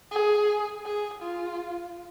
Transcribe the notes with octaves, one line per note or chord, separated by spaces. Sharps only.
G#4
G#4
F4